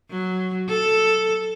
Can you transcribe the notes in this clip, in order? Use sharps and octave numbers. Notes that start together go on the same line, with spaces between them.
F#3
A4